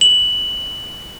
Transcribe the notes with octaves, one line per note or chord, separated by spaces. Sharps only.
F#7